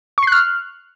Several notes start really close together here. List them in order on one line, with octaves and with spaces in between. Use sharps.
C#6 C7 F#6 F6